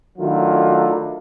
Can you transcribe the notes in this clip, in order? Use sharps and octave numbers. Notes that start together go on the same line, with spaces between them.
D#3 F#3 A3 D4 E4 F4